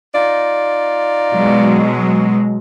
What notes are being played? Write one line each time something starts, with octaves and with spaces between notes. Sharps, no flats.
D#4 F4 D5
B2 F#3 G#3